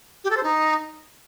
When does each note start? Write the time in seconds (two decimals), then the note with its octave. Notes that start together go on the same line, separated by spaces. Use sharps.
0.24 G4
0.31 A4
0.37 C5
0.43 D#4